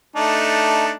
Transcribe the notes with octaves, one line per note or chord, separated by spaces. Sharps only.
A3 D4 D#4